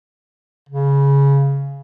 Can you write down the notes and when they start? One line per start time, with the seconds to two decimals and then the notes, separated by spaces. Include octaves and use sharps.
0.69 C#3